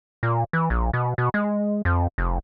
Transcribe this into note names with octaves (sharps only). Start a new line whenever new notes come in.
A#2
E3
A#1
B2
B2
G#3
F2
F1